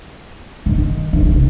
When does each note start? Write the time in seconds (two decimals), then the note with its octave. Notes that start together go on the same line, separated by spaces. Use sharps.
0.66 D3
0.75 D#3
1.13 D#3
1.22 D3
1.32 C3